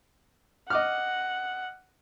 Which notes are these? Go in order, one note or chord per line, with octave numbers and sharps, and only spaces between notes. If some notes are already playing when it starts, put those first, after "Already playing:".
D#5 F#5 D6 F6